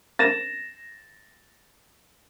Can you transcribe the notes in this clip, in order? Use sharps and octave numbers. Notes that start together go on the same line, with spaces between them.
A6 A#6 E7